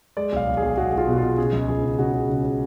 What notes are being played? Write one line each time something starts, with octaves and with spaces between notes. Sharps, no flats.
G#3 D5
B1 F5
B1
G#4
B1
B1 F#4
B1
F4
B2 F#4
F4
B2
C#3 G#4
C#2
C#2 G#4
C#3
C#3 F#4
C#3
C#3
C#3